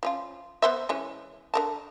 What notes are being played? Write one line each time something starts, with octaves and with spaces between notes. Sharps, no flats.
F3 C#4 F4
B3 C5 E5
E3 G#3 C#4
D3 A#4 A5